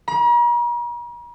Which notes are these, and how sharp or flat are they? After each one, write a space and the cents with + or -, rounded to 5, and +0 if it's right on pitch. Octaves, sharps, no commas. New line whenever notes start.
A#5 +45